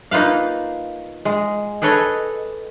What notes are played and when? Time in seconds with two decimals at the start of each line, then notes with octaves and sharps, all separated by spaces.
0.11 A#3 D#4 F4 B4 F5
1.25 G#3
1.82 G#4 A4 B4 C#5 D#5